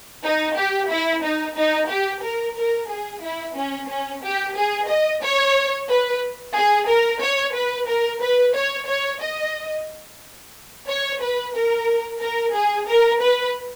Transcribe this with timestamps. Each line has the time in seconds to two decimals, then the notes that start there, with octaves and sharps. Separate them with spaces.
0.24 D#4
0.56 G4
0.89 E4
1.24 D#4
1.56 D#4
1.89 G4
2.23 A#4
2.56 A#4
2.89 G#4
3.22 E4
3.56 C#4
3.89 C#4
4.23 G4
4.56 G#4
4.89 D#5
5.22 C#5
5.90 B4
6.56 G#4
6.89 A#4
7.22 C#5
7.55 B4
7.89 A#4
8.23 B4
8.56 C#5
8.89 C#5
9.22 D#5
10.89 C#5
11.22 B4
11.55 A#4
12.22 A#4
12.55 G#4
12.88 A#4
13.22 B4